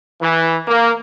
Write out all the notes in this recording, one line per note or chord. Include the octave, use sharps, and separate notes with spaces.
E3
A#3